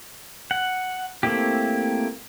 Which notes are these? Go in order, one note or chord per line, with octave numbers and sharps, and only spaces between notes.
F#5
A3 A#3 C4 E4 G4